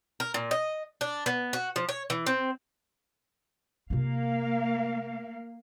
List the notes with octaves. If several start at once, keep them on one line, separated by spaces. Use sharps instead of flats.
A#4
A#2
D#5
D4
B3
F#4
F3
C#5
E3
C4
C3 A#3 F4 F5